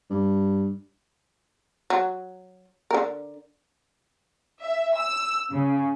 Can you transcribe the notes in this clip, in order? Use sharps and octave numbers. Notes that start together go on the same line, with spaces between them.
G2
F#3
D3 A#4
E5
E6
C#3